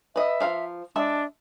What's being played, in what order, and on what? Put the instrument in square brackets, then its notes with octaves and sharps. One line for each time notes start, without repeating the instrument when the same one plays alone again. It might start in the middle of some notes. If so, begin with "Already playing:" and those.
[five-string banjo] B4 D#5 [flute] E5
[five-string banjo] F3 F5 A#5
[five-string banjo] G#3 E5 A5 [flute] D4